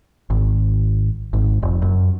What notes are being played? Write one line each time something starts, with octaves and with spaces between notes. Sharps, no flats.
G#1
G#1
F1
F#2